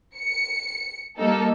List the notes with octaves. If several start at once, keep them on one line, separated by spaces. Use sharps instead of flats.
C#7
G3 A#3 D#4 A4